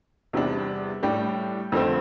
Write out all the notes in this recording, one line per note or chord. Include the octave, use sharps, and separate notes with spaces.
E2 C3 G3 D4
A2 G3 D4 G4
F2 D3 F3 A3 C4